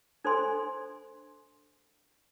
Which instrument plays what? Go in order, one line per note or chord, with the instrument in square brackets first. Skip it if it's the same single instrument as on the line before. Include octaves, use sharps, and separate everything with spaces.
[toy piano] D4 A4 C5 G#5 C6